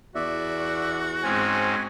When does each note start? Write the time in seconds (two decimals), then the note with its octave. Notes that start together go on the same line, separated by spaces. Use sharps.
0.15 E2 F#4 D5 E5
1.23 G#2 C4 C#4 G#5